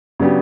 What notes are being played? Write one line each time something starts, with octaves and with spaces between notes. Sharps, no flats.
C#3 F#3 B3 D4 G4